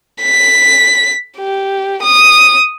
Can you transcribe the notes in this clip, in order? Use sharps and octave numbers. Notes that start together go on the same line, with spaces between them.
B6
G4
D#6